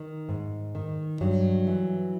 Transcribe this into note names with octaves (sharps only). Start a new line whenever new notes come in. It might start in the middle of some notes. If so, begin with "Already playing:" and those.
Already playing: D#3
G#2
D#3
G2 F#3
E3